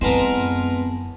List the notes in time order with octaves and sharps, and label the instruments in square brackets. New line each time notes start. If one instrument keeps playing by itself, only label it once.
[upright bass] F#2 E4 [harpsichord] G#3 B3 A#4 [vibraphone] C4 A5